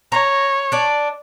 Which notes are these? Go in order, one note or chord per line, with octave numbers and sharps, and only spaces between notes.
C#5 A#5
D4 D5